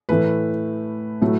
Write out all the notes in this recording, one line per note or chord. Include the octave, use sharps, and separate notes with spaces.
A2 E3 A3 B4
A2 F#3 A3